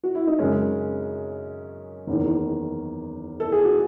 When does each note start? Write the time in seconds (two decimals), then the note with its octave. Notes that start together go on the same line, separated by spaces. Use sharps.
0.04 F#4
0.15 E4
0.27 D#4
0.39 F#2 C#3 G#3 C#4
2.07 F#1 E2 D#3
3.40 A4
3.52 G#4
3.64 F#4